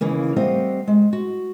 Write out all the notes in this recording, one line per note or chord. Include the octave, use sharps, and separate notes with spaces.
D#2 C#3 E3 A#3
G3 A3 C4 D#5 F5 F#5
G#3
F#4